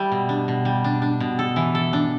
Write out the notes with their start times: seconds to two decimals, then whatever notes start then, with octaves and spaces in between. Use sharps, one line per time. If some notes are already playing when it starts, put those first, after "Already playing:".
Already playing: G3 E4
0.12 B2
0.29 D4
0.48 B2
0.65 G3
0.84 D4
1.02 D4
1.20 B2
1.39 A4
1.56 E3
1.75 A4
1.93 D4